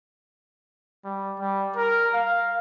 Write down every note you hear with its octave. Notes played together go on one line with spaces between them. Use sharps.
G3
G3
A#4
F5